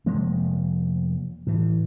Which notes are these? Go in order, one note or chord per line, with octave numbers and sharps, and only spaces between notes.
F1 F3 G#3 A#3
A2 E3